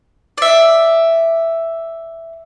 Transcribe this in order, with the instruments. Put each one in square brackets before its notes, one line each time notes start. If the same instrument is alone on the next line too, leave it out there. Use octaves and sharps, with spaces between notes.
[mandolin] D5 E5